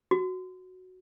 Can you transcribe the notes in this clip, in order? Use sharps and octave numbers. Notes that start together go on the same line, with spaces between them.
F#4